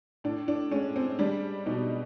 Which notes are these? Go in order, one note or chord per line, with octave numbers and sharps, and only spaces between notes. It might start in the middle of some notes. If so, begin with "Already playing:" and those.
A2 D4
D4
G#3 C#4
C4
G3 D4
B2 D#4